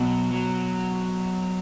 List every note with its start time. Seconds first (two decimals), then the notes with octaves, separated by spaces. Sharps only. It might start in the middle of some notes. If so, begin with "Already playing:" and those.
Already playing: B2 F#3
0.31 F#3